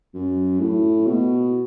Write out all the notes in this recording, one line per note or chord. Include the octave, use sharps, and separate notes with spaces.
F#2
A2
B2